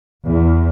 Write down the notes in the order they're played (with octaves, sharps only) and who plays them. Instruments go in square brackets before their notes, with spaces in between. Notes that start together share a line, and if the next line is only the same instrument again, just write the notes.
[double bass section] E2